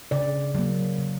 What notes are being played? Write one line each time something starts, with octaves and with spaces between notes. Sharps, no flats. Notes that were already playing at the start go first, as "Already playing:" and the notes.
C#3 D5
F#3 A#3
C#3